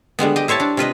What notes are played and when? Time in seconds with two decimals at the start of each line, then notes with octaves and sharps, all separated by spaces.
0.19 D3 G3 G#3 B3
0.36 G4 D#5
0.48 E4 C5 C#5 E5 A5
0.60 D4
0.77 C3 F4 B4 D#5